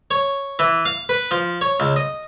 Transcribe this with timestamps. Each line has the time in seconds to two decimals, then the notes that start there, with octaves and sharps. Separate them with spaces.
0.11 C#5
0.59 E3
0.85 F5
1.09 B4
1.31 F3
1.61 C#5
1.80 C#2
1.96 D#5